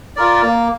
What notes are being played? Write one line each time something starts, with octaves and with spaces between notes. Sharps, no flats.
F4 A#4 D5
A#3